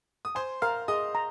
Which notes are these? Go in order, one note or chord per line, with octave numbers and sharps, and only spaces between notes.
D#6
C5 G#5 C6
A#4 F5 F6
G#4 D#5 D#6
A#5